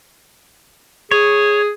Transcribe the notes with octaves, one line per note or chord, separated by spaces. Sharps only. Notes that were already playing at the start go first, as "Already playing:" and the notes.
G#4 C#5